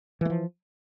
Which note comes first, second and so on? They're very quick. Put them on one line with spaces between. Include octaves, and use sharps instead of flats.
E3 A3 F3